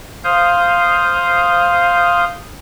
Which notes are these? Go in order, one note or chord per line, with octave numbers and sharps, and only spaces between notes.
C5 F5 D#6 G6